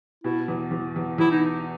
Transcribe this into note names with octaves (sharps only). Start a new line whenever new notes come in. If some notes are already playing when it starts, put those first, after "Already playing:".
B2 E4
E2
E2
E2
E2 E4
D#4